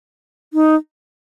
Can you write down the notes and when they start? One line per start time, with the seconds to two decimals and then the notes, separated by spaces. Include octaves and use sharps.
0.53 D#4